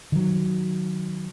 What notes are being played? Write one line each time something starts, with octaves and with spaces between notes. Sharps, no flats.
D#3 F#3